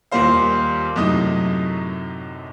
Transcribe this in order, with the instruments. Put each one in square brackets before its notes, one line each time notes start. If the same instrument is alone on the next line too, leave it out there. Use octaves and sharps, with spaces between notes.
[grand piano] D#2 A#2 G3 A#3 C5 F5
F#2 A2 C3 D#4 D#6